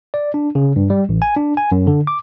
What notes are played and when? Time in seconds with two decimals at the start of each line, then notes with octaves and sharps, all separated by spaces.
0.14 D5
0.34 D4
0.55 C#3
0.76 G2
0.90 G3
1.09 A1
1.22 G#5
1.37 D4
1.57 G#5
1.72 F#2
1.87 D3
2.07 D6